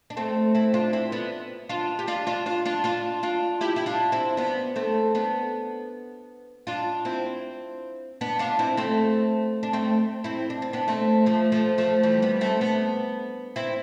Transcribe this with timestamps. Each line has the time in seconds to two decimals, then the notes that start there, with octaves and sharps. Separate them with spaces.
0.10 D4
0.17 A3 C4
0.55 C4 E4
0.74 D4 F4
0.93 C4 E4
1.12 B3 D4
1.69 D4 F4
1.99 G4
2.07 D4 F4
2.27 D4 F4
2.46 D4 F4
2.66 D4 F4
2.84 D4 F4
3.23 D4 F4
3.61 E4 G4
3.76 E4
3.86 D4 F4
4.12 C4 E4
4.37 B3 D4
4.76 A3 C4
5.15 B3 D4
6.67 D4 F4
7.05 C4 E4
8.21 B3 D4
8.39 D4 F4
8.59 C4 E4
8.77 A3 C4
9.63 D4
9.73 A3 C4
10.24 C4 E4
10.50 D4
10.62 C4
10.73 B3 D4
10.88 A3 C4
11.26 F3 A3
11.52 F3 A3
11.78 F3 A3
12.03 E3 G3
12.22 G3 B3
12.41 A3 C4
12.61 B3 D4
13.56 C4 E4